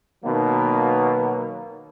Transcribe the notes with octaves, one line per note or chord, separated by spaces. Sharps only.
B2 D#3 F#3 A#3 B3